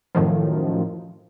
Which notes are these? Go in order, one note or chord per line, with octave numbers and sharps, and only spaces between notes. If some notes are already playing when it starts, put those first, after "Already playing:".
F#2 A2 D#3 F3